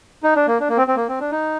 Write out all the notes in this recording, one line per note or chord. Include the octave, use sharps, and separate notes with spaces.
D#4
D4
A#3
D4
A#3
C4
C4
A#3
C4
D4
D#4